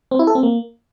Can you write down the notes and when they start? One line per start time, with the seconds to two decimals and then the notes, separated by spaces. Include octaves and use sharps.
0.11 C4
0.19 E4
0.27 A4
0.35 C4
0.43 A#3